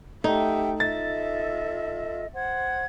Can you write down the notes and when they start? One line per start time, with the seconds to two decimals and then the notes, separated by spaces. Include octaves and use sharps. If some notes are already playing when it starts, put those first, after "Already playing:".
0.24 A3 D#4 G4 E5 F#5 G5
0.80 F4 A4 D#5 E5 A6
2.34 C5 F#5 G#6